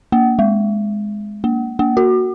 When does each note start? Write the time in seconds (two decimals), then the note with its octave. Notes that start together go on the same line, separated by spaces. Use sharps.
0.12 A#3
0.39 G#3
1.44 A#3
1.79 A#3
1.97 F#4